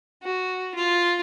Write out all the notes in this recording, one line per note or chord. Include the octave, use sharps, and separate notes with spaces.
F#4
F4